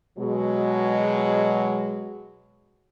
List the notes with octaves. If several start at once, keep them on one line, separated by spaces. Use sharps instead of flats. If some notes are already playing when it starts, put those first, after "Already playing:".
B2 F#3 G#3